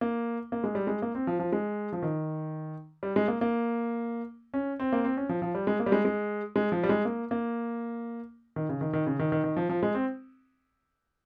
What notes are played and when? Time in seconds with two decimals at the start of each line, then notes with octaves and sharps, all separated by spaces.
0.01 A#3
0.52 A#3
0.64 G#3
0.75 G3
0.87 G#3
1.02 A#3
1.15 C4
1.27 F3
1.39 F3
1.52 G#3
1.92 F3
2.02 D#3
3.03 G3
3.16 G#3
3.28 A#3
3.41 A#3
4.54 C#4
4.80 C4
4.93 A#3
5.04 C4
5.17 C#4
5.29 F3
5.42 F3
5.55 G3
5.67 G#3
5.80 A#3
5.86 G3
5.92 G#3
6.05 G#3
6.56 G#3
6.72 F3
6.83 G3
6.89 G#3
7.05 A#3
7.31 A#3
8.56 D#3
8.69 C#3
8.81 D#3
8.93 D#3
9.07 C#3
9.19 D#3
9.32 D#3
9.44 D#3
9.57 F3
9.69 F3
9.83 G#3
9.95 C4